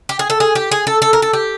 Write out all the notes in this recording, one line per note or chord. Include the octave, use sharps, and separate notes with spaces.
G4
G#4
A4
G#4
G4
G#4
A4
A4
A#4
A4
G4